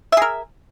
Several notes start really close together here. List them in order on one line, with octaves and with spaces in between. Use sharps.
E5 G#4 A#4